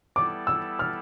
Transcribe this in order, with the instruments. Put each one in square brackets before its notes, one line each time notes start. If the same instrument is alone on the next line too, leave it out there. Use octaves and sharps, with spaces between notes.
[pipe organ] G3 B3 E4 A4 D5 [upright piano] D6
[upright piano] E6
F6